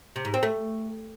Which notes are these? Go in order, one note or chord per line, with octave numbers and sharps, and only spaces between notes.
C3
G#2
C4
A3